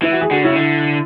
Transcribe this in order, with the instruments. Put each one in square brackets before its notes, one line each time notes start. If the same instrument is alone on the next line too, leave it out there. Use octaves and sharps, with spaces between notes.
[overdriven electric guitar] E3 [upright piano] E4
[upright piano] F#4
G#4
[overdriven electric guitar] D3 [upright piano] F#4
[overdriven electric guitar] C#3 [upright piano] E4
[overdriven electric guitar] D3